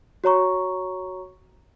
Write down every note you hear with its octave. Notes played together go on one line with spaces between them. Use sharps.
F#4 C#5 A#5 C#6